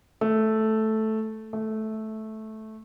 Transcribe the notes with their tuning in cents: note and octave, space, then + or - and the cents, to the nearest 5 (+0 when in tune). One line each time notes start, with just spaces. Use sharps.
A3 -5
A3 -10